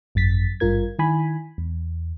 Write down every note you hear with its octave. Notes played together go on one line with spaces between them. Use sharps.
G#1 F#2 A6 B6
G#1 G2 F4 A#4 G#6
D#3 E4 G#5 B5
E2